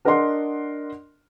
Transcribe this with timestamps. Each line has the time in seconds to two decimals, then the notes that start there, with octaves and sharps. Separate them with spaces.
0.05 D4 A#4 D5 D#5 F#5 C6